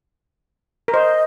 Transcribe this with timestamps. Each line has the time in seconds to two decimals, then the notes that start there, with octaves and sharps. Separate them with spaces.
0.88 A#4
0.93 C5 D#5